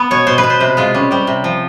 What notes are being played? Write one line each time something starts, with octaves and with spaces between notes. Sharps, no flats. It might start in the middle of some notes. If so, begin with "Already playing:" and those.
Already playing: B3
B2 C#5
B2 C5
B4
B2
C5
C3 B4
G#3 F4
G3 C#4
G3 C4
C3
F3